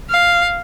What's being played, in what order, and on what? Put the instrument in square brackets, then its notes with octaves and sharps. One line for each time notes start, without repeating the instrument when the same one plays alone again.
[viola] F5